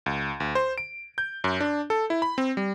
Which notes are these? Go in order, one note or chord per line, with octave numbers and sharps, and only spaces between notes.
C#2
D2
C5
D7
G6
F#2
D4
A4
E4
B5
C4
G3